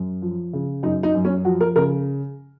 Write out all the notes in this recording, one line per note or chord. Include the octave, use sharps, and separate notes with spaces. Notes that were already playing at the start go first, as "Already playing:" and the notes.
Already playing: F#2
F3
C#3
F#2 D#4
D#4
F#2
C#4
F3 F#4
A#4
C#3 A#4